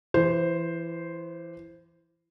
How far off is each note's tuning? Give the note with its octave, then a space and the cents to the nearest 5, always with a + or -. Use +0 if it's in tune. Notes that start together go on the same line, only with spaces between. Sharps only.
E3 +20 C5 +0